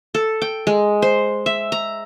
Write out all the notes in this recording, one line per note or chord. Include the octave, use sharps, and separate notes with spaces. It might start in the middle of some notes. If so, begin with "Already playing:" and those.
A4
G5
G#3
C5
E5
A#5